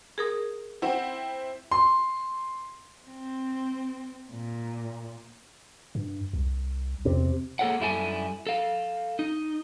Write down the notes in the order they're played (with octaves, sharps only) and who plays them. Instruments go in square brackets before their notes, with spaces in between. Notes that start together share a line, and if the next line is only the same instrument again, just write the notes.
[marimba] G#4 A#4 D#6
[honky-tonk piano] C4 E4 [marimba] F#5
[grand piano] C6
[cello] C4
A#2
[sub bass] G2
C2
[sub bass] E2 [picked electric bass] C3
[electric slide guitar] A#3 G#4 A4 B4 C#5 F#5
F#2 G3 E4 F#4 A4 G#5
A4 F5
D#4